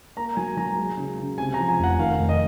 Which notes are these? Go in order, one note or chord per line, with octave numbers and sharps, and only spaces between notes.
A#3 A#5
F#3 G#5
F#3 A#5
G#3
C#3
C#3
C3 G#5
A#5
F3
G#5
F1 F#5
D#3 F5
F1
D#5